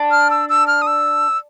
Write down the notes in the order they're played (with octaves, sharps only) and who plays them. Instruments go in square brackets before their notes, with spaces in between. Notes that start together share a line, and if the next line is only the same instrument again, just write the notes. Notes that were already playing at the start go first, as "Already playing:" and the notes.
Already playing: [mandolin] D4
[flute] F6
E6
E6
F6
D#6
E6